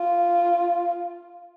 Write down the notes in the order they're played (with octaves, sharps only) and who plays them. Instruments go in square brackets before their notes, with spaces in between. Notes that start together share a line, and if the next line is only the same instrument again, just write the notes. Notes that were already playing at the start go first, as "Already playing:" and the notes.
Already playing: [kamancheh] F4